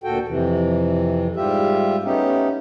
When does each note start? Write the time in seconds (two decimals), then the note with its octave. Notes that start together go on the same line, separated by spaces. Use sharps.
0.04 D2 A#2 F#4 A4 G5
0.28 F2 C3 E3
1.36 G#2 G3 F4 G4 E5
2.04 A3 B3 C#4 D#4 G4